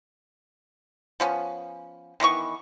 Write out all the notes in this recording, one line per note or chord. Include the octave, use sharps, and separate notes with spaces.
F3 B3 C#4
D#3 E3 B3 C#6